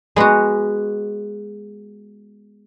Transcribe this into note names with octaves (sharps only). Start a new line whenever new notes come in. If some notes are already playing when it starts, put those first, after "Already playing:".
G#3 B3 F#4